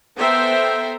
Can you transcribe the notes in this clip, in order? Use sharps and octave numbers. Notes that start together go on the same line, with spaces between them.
B3 A4 C5 E5 G5 A#5